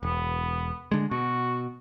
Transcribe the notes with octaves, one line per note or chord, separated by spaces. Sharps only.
E1 B3
D3 G#3
B2 F#4